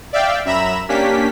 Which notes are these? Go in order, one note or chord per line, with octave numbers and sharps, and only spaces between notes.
D5 E5 F5 G5
F#2 E5 A#5 B5 E7
A#3 C#4 D4 G4 B6